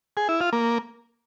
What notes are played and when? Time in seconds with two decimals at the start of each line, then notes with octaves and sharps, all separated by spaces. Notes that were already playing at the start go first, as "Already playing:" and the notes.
0.17 G#4
0.29 E4
0.41 F4
0.53 A#3